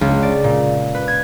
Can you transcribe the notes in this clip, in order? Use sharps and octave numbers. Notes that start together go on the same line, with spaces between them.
C#2
D5
A#2
B4
G#6